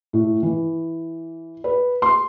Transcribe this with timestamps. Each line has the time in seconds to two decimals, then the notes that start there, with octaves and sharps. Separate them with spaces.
0.13 A2
0.43 E3
1.64 B4
2.02 C6